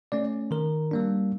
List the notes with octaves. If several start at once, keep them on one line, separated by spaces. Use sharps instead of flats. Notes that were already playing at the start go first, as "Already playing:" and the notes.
A3 C#4 D5
D#3 A#4
G3 A#3 D4